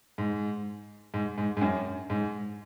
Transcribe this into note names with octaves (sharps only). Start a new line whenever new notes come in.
G#2
G#2
G#2
G#2
F#2
G#2